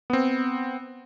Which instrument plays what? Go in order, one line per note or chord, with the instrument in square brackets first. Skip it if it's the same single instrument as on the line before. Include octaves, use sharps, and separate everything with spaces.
[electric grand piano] B3 C4